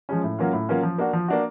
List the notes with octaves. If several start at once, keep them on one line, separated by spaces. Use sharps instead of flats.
F3 G#3 C#4
A2
F#3 A#3 C#4 F4
A2
F#3 A#3 C#4 F4
F3
A#3 D4 F#4
F3
A#3 D4 F#4